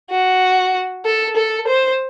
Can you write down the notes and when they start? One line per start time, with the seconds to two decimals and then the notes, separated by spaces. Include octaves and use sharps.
0.10 F#4
1.05 A4
1.37 A4
1.68 C5